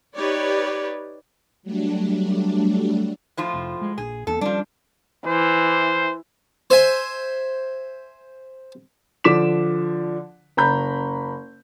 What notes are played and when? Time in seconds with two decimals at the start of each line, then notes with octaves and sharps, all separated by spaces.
0.16 D#4 G4 B4 C#5 D5
1.63 F#3 G3 A3 D4
3.37 A2 F3 F4
3.54 F1
3.81 G#3
3.98 A#1 G#4
4.27 E2 A#3 C4 A4
4.41 F3 G3 C#4 D4
5.27 E3 C5
6.70 C5 E5 G#5
9.24 D3 F3 D6 B6 E7
10.57 F#1 A#5 B5 G6